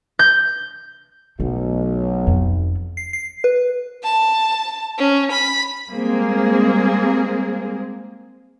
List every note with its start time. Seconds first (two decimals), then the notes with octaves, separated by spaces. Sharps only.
0.19 G6
1.40 B1 A3
2.27 F1 F2
2.97 C7
3.13 C7
3.44 B4
4.03 A5
4.98 C#4
5.32 B5
5.89 G3 G#3 A#3 C4 G#4